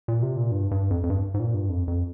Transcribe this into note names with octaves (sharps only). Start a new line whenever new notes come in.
A#2
C3
A#2
G2
G2
F2
F2
G2
G#2
A#2
G2
F2
F2